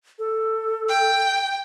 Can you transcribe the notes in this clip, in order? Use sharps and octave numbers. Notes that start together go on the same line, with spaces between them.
A4
G5